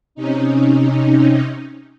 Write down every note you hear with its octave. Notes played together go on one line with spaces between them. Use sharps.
C3 C#4 D#4